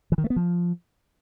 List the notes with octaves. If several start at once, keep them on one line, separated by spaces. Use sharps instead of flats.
E3
D#3
A3
B3
F3